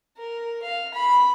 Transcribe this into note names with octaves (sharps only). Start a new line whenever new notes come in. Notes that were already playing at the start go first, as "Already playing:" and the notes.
A#4
F5
B5